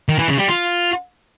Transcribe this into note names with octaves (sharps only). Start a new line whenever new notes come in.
D#3
E3
C#3
G3
F4